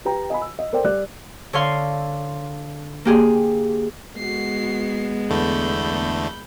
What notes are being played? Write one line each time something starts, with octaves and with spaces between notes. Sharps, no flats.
G4 B4 G5 A#5
D#5 G#5 B5
E6
D#5
A4 A#4 C5 D5 G5
G3 D5 F#6
D3 C#5 F5 C6
A#3 G4 G#4
G#3 B3 F#4 C7
E2 D3 A3 B5 G6